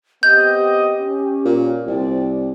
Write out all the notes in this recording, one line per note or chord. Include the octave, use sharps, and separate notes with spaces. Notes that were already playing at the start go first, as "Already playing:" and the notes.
B3 C4 G4 D#5 G6
C#4
A#2
C2 C4 D5